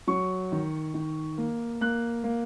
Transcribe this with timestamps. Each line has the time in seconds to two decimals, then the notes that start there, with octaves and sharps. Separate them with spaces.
0.07 F#3 C#6
0.52 D#3
0.94 D#3
1.38 A#3
1.81 A#3 F#6
2.24 A#3